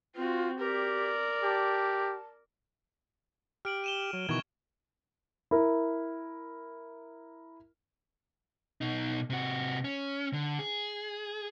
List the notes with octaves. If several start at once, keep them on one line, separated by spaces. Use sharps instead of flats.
C4 F4 F#4
G4 A#4 D5
G4 A5
G4 F6 D7 F#7
D#7 E7 G7
F#3
B2 D#3 E3 C#6 G#6
E4 A#4
B2 D#4
C3 F#4
C#4
D3
G#4